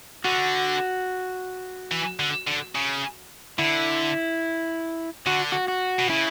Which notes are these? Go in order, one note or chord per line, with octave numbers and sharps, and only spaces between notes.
D3 F#4
E3
D3
D3
C#3
D3 E4
D3 F#4
F#4
F#4
B2
C#3 E4